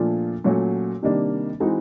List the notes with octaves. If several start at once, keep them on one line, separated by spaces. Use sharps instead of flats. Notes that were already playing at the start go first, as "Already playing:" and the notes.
Already playing: A#2 F3 A3 D4 F4
A#2 F#3 A3 C#4 F#4
C3 D#3 G3 A#3 D4
E3 G#3 C4 D#4 F#4